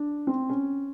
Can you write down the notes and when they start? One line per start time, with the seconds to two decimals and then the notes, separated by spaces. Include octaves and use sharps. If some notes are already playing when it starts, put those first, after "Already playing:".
Already playing: D4
0.27 C4
0.49 C#4